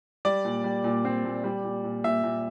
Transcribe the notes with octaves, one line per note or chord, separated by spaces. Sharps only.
G3 D5
A#2
G3
A#2
C4
A#2
G3
A#2
A#2
A#2 E5
A#2